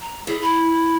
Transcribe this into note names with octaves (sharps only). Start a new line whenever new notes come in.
A#5
E3 G#4
B5